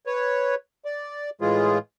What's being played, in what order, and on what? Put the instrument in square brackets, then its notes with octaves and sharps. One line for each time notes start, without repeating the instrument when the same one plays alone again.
[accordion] B4 C#5
D5
A2 E3 G#3 F4 G#4